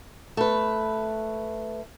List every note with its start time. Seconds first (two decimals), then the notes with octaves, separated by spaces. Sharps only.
0.37 A3 B4